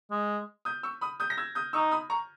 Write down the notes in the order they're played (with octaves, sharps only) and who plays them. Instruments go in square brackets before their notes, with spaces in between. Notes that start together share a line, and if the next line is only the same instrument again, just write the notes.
[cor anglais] G#3
[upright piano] D#6 G6
C#6 E6
B5 D#6
D#6 G6
A#6
E6 G#6
D#6 G6
[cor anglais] D#4 [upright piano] C#6 E6
[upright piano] B5 D#6
A#5 C#6